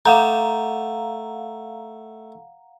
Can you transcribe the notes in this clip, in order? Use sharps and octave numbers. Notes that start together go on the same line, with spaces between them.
A3 F5 F#5 A#5